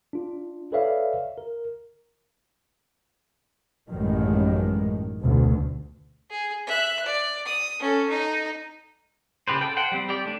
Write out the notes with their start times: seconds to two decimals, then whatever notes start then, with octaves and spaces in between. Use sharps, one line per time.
0.13 D4 F4
0.72 A4 B4 C#5 D5 E5 F5
1.38 A#4
3.89 A1 F#2 A2 D#3 G3 G#3
5.23 F1 D2 B2
6.30 G#4
6.67 E5 F#6
7.06 D5
7.45 D#6
7.80 C#4 A4
8.09 D#4
9.48 C#3 G4 B4 C5
9.61 A4 G5
9.77 C5 F#5 G5
9.92 G3 C4
10.09 G4 D5
10.25 A3 D4